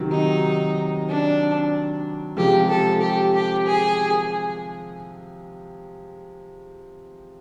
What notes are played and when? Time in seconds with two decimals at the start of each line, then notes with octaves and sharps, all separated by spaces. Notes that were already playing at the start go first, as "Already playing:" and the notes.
Already playing: C3 D#3 F#3
0.11 D#4
1.08 D4
2.37 C3 F3 G#3 G4
2.69 A4
3.02 G4
3.33 G4
3.66 G#4